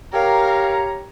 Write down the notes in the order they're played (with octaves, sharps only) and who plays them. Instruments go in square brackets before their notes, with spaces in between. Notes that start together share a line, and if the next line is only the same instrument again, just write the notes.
[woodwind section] G4 C#5 A#5 [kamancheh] A#4 F5